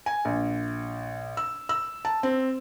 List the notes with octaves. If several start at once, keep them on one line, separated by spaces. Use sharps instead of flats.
G#5
A#1
E6
E6
A5
C4